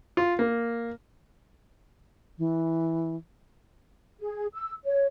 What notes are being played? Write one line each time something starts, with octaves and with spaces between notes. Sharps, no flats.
F4
A#3
E3
G#4
E6
C#5